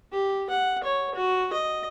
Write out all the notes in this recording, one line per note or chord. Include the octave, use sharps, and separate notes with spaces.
G4
F#5
C#5
F#4
D#5